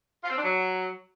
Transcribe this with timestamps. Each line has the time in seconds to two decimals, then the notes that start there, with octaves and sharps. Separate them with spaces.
0.23 F4
0.30 C4
0.37 D4
0.43 F#3